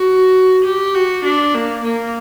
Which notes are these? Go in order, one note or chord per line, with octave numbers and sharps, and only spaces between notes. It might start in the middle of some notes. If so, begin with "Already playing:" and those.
Already playing: F#4
G4
F#4
D4
A#3
A#3